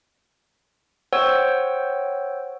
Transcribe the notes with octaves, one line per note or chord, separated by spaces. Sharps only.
C5 C#5 F#5 G5 E6